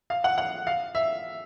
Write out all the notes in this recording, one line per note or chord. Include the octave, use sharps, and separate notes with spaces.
F5
F#5
F#5
F5
E5